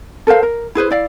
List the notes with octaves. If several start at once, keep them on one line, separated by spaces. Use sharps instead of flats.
A4 A#4 C5 F5
A#4
E4 G#4 B4 C5
E4 D5 F5